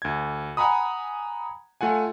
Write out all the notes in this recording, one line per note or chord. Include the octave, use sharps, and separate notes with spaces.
D2 G#6
F#5 G#5 A#5 B5 D#6
A3 F4 F#5 G#5